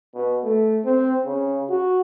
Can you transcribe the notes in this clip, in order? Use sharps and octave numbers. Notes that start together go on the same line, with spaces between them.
B2
A3
C4
C#3
F#4